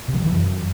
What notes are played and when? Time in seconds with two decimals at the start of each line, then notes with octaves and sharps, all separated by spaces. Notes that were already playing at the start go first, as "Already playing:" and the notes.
0.08 C3
0.14 F3
0.20 D#3
0.26 E3
0.32 F#2